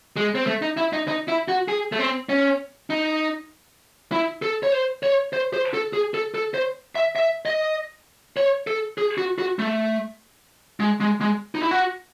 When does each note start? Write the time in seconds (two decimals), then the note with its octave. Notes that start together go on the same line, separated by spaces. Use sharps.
0.17 G#3
0.35 C4
0.47 A3
0.62 D#4
0.77 E4
0.93 D#4
1.08 D#4
1.28 E4
1.48 F#4
1.68 G#4
1.92 A3
1.99 C4
2.29 C#4
2.90 D#4
4.12 E4
4.42 A4
4.63 C#5
4.72 C5
5.03 C#5
5.33 C5
5.53 C5
5.74 A4
5.93 G#4
6.14 A4
6.34 A4
6.54 C5
6.95 E5
7.16 E5
7.46 D#5
8.37 C#5
8.67 A4
8.98 G#4
9.18 F#4
9.38 F#4
9.59 A3
10.80 G#3
11.01 G#3
11.21 G#3
11.55 D#4
11.63 E4
11.71 F#4